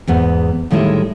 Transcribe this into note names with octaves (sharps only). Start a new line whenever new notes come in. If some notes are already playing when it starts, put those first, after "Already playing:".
E2 G#2 B3
A2 D#3 G3 G#3 E4